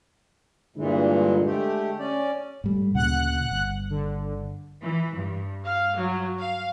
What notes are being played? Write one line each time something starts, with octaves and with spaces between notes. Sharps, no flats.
G2 A#2 D3 E3 G#3
A3 G4
C#4 D5
G#2 G3 A3
D2 A#2 C#3 F#5 F#6
G1
D3
E3
G2
F5
F#3
F5